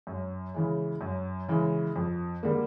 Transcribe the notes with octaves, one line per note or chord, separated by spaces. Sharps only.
F#2
C#3 E3 G#3
F#2
C#3 E3 G#3
F2
D3 G3 A#3